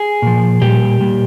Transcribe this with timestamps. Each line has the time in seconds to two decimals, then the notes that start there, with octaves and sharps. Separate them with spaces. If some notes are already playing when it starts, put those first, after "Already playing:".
Already playing: G#4
0.22 A#2 F3
0.61 A#2 G3 G4
1.00 A#2 G3